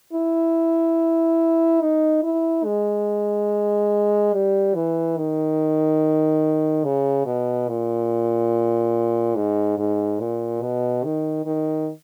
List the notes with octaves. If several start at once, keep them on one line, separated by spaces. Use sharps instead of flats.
E4
D#4
E4
G#3
G3
E3
D#3
C#3
B2
A#2
G#2
G#2
A#2
B2
D#3
D#3